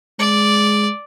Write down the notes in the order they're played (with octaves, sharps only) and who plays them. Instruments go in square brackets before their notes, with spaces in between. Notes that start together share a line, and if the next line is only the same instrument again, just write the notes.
[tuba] G#3 [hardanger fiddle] D5